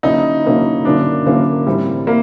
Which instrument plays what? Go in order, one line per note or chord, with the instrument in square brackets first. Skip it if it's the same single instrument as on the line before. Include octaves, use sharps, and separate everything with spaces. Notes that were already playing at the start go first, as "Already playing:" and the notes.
[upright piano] D3 F#3 A#3 C#4 E4 [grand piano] D#4
[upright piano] D3 F#3 A#3 C#4 E4
[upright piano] D3 F#3 A#3 C#4 E4 [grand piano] D4
[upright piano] D3 F#3 A#3 C#4 E4
A2 E3 G3 C4 E4
[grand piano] A#3 [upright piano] E4